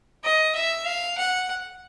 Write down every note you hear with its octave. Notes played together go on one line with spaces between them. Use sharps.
D#5
E5
F5
F#5